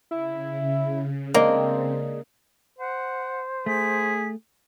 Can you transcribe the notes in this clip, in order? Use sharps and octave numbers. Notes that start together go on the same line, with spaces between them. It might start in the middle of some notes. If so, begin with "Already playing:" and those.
C#3 E4
G#3 A#3 C4 D4 D#5
C5 F#5
A3 G#4 B6